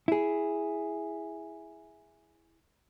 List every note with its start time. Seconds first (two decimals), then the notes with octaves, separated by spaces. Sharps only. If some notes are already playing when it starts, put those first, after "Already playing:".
0.08 E4 G#4